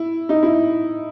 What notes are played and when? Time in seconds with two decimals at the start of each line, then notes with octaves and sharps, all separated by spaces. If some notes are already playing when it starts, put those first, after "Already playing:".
Already playing: E4
0.29 D#4
0.43 E4